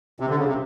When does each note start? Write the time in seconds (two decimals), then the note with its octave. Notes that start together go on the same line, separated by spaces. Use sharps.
0.20 C3
0.29 D3
0.38 C#3
0.47 C3